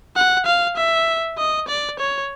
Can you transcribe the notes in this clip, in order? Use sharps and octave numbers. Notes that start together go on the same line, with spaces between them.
F#5
F5
E5
D#5
D5
C#5